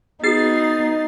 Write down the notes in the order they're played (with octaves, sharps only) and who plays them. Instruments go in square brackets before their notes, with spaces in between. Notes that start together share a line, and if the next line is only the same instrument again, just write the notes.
[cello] B3 [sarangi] D#4 [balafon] F#4 G#4 [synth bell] A6 C7